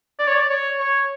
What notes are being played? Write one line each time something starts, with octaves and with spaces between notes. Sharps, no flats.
D5
C#5
D5
C#5
C#5